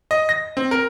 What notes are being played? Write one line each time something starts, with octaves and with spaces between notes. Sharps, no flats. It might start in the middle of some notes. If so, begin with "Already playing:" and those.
D#5
A#6
C4
A#4